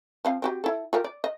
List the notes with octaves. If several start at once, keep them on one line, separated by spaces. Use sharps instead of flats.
F3 C4 F5
C4 F#4 G4
E4 A4
F4 G4 A#4
D5
D#5